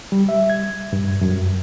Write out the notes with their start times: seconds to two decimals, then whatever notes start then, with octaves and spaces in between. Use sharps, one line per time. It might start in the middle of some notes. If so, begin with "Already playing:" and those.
0.12 G3
0.29 E5
0.50 G#6
0.93 G2
1.21 F#2